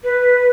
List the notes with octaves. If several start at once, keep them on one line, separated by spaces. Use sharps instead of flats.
B4